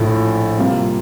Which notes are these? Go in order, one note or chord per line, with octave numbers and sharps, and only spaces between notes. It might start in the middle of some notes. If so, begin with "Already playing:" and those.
Already playing: A#1 A2 F3 A3 E4
C3 G3 A#3 F4